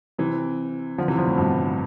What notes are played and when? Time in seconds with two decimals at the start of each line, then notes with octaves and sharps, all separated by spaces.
0.18 C3 E3
0.98 D3 F3
1.08 C3 E3
1.18 D3 F3
1.27 A2
1.38 G2 B2